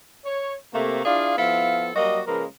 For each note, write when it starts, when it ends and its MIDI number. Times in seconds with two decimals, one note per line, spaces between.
0.25 0.55 73
0.74 1.03 48
0.74 1.03 57
0.74 1.03 58
1.05 1.37 62
1.05 1.37 64
1.05 1.37 65
1.05 1.37 68
1.05 1.37 74
1.05 1.37 77
1.37 1.90 53
1.37 1.90 59
1.37 1.90 64
1.37 1.90 69
1.37 1.90 77
1.95 2.21 54
1.95 2.21 55
1.95 2.21 58
1.95 2.21 66
1.95 2.21 75
2.26 2.46 49
2.26 2.46 53
2.26 2.46 56
2.26 2.46 58
2.26 2.46 70
2.26 2.46 71